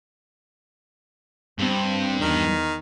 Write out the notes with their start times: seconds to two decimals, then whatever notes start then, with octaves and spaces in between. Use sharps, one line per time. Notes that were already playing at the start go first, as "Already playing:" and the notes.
1.59 G2 C4
2.21 E2 D#3